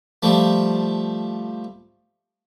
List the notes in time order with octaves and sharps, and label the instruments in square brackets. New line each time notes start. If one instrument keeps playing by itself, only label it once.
[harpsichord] F3 G3 A3